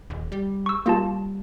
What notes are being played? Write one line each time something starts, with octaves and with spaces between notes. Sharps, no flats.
D#1
G3
C#6 E6
G3 A#3 F4 A5